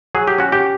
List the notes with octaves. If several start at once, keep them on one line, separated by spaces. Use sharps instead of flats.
F#3 G#4
G4
C#4 F#4
G4